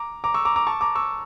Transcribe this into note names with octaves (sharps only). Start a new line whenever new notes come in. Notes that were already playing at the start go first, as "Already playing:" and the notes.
Already playing: A#5 D6
A#5 D6
C#6 E6
A#5 D6
A#5 D6
A5 C#6
A#5 D6
C#6 E6